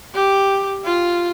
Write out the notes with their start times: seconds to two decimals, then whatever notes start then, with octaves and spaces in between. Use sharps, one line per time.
0.14 G4
0.84 F4